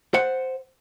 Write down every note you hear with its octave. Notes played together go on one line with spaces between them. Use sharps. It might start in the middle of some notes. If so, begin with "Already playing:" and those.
C5 F#5